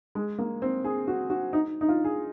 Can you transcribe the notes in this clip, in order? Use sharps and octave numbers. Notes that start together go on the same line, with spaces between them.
G#3
A#3
C4
G#4
F#4
F#4
D#4
D#4
F4
G#4